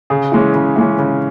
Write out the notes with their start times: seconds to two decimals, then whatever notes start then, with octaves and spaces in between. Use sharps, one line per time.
0.10 C#3 G#4
0.32 E3 G#3 C#4
0.55 C#3
0.76 E3 G#3 C#4
0.99 C#3